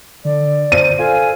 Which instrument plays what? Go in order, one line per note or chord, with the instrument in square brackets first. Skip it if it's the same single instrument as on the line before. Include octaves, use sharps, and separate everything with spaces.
[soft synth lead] D3 [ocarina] D5
[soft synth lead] C5 [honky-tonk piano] D#7
[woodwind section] F4 F5 G#5 [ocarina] A4